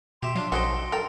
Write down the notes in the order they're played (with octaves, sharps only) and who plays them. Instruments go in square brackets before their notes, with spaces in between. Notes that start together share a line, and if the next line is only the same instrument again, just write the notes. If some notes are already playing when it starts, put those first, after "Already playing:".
[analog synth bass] B2 [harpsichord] G4 E5 [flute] C6
[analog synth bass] F#3 [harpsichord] D4 F4
[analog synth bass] A#1 [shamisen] F#3 D#4 C5 [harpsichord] A4 D#5 G5
[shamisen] A4 G5 [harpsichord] A#4